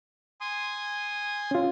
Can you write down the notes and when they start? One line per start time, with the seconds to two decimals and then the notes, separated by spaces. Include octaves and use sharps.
0.41 G#5 C6 D#6
1.51 C#4 F4